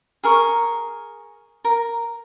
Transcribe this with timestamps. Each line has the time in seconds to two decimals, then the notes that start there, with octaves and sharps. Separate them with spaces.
0.24 G#4 A#4 C#6
1.65 A#4